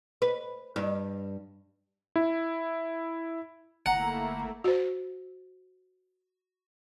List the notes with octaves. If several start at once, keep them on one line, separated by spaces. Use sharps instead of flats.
B4
G2
E4
G1 A3 A#3 E4 F#5 A#5
F#4 C5